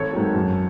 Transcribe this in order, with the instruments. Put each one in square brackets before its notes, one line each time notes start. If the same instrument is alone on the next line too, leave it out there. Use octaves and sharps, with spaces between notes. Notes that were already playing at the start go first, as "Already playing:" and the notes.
Already playing: [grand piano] G#1 A4 C#5
G#2 D#3 F#3
F#2